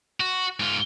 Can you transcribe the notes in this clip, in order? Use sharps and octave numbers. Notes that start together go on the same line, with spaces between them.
F#4
G#2 F4